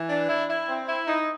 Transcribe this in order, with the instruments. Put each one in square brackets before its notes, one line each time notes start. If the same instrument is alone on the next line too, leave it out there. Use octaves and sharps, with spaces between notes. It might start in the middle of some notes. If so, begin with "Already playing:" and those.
Already playing: [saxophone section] E3
D4
E4
E4
C4
E4
D#4